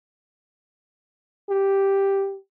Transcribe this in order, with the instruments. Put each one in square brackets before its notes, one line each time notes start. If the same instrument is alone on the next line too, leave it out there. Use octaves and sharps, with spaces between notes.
[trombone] G4